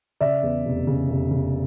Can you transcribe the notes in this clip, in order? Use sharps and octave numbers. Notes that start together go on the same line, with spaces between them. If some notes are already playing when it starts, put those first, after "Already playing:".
C#3 D5 E5
E2
F1
C#3
F1
C#3